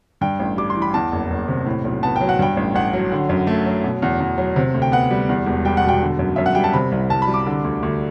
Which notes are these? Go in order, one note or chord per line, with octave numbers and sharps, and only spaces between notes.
G2 G5
A1
G3 D6
C6
E3
B5
E2 A5
F#1
F#1
C3
A2
B1
B3 A5
F#3 G5
F#5
G2 G5
A1
A1 F#5
F#3
D3
F#2
A3
F#3
B2
E2
E2
F#3
C3
D2
G5
B3 F#5
G3
E2
E1
G3 G5
F#5
B2
G5
D3
F#2
F#2 E5
F#5
G3 G5
A5
C3 B5
C2
C2 A5
B5
G3
D6
D3
D2
D2